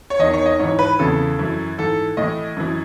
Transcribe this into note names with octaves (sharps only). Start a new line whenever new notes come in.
C#5
E2 D#3 D#5
C#5
D#5
G#2 E3 C#5
B4
E2 C#3 E3 A4
F#2 E3
G#2 E3 A4
A2 D#5
E3
F#2 E3